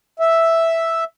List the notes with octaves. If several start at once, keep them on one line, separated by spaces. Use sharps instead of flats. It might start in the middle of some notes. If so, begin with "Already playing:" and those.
E5